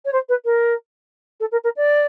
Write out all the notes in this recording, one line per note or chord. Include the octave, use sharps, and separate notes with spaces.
C#5
C5
B4
A#4
A4
A#4
A#4
D5